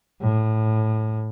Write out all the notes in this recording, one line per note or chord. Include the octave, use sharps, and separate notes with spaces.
A2